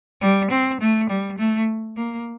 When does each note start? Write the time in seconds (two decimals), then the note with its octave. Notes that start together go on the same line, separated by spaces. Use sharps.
0.21 G3
0.51 C4
0.81 A3
1.10 G3
1.38 A3
1.97 A#3